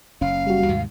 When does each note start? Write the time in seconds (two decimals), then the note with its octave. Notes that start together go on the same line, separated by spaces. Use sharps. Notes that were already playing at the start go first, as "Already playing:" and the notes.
0.21 F#1 C#4 F5
0.47 G3 F#4
0.68 D#2 G#2 C3